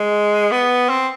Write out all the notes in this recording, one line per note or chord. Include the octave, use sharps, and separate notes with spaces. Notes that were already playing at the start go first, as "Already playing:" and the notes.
Already playing: G#3
B3
C4